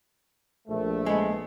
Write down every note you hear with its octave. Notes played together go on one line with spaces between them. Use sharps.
A#1 A3
G#3 B3